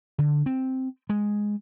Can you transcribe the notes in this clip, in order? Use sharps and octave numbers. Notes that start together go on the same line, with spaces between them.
D3
C4
G#3